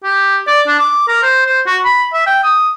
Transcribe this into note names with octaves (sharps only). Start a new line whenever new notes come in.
G4
D5
D4
D6
A#4
C5
C5
F#4
B5
E5
G5
D#6